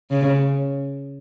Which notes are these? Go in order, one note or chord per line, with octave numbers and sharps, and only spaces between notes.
C#3